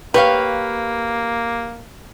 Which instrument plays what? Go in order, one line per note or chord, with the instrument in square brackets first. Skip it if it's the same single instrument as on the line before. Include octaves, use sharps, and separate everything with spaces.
[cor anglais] A#3 [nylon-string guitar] G4 C#5 F5 [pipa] B4